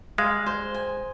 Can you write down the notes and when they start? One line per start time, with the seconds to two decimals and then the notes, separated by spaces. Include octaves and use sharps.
0.18 G#3 F5
0.47 C5
0.74 G#5